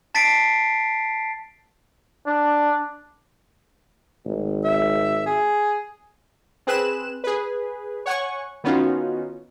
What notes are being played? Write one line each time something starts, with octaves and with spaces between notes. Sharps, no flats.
A5 A6 B6 C7 D7
D4
G#1
E5
G#4
C4 G#4 B4 F#6 E7
G#4 B4
C#5 F#5 G#5 C#6
D#3 B3 C#4 D#4 F4 F#4